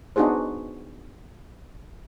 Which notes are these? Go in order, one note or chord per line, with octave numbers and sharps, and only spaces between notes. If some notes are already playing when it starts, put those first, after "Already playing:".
B3 D4 D#4 F#4 G#4 C5